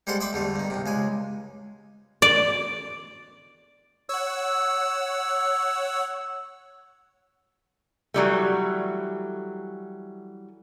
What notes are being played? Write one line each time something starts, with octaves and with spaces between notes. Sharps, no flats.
G3 G#3 A4 C5 F#5 C6
D#5 E5 G5 B5 C6 D6
E2 D3 G3 A3
G2 D#3
C2 C3
C#2 G#3 G#5
D5
C#5 F#5 E6
E3 F#3 G3 A3